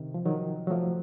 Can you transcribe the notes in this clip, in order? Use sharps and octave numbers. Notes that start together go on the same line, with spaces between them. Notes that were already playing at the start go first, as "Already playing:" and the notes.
Already playing: C3 D#3
F3
D#3 F#3
F#3
F3 A3